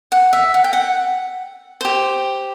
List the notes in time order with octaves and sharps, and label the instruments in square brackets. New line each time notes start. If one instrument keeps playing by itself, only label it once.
[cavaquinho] F#5
E5
F#5
G5
F#5
G4 C5